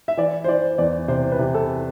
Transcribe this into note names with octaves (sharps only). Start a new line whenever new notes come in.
E5
E3 D5
C5
E3 D5
E2 D5
C3 C5
B4
C3
A4